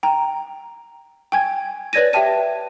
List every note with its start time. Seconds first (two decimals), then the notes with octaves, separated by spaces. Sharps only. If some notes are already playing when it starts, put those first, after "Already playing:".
0.03 G5 A#5
1.32 G5 G#5 G#6
1.93 B4 C#5 D5 G#6 A#6 D#7
2.13 G4 E5 G5 A5 D#7